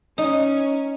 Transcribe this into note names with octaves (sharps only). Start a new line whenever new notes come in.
C#4 D#4